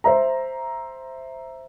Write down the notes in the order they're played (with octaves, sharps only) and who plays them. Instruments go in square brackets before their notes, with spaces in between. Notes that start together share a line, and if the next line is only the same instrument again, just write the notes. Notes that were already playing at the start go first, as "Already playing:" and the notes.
[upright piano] C5 E5 A#5